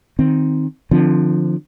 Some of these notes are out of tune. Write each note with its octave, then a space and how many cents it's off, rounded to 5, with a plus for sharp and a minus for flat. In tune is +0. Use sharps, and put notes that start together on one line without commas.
D#3 +0 C4 +0
D3 +25 F3 +0 C4 +0